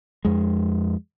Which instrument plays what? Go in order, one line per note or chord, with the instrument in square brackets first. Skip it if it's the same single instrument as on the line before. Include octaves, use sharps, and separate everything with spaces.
[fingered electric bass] F2 G#3